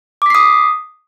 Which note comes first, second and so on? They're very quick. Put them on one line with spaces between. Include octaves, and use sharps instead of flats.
D6 B6 C7 D#6